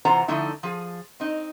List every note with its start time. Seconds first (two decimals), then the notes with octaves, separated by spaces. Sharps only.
0.05 C3 E3 F4 C5 F#5 A#5
0.28 D3 F3 A3 D#4 E4
0.63 F3 G#4
1.20 C4 D#4